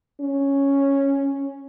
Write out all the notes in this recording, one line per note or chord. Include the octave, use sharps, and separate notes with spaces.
C#4